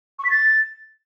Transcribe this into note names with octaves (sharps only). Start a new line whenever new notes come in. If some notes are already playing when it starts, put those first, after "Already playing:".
C#6
B6
A6